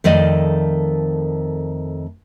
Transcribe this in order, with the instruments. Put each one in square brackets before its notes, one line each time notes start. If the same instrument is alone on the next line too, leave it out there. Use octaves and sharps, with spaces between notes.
[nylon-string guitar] F2 D#3 A3 D5 D#5